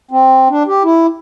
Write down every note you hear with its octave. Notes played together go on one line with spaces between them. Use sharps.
C4
D4
G4
E4